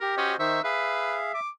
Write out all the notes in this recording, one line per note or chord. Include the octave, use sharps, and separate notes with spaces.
G4 A#4
C#4 F#4 C5 D#5
D#3 D#4 C5 E5 C#6
G#4 B4 E5 F5
D6